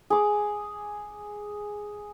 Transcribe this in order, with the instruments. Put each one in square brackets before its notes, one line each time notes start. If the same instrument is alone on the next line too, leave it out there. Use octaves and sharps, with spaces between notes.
[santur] G#4 D6